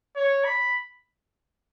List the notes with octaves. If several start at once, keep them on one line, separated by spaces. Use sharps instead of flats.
C#5
B5